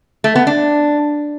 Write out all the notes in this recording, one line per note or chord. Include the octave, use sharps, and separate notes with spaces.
A3
B3
D4